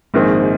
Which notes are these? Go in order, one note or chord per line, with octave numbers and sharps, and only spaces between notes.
A#1 G#2 D#3 C4